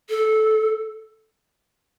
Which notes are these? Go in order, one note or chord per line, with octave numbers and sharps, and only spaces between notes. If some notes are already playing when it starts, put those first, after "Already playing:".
A4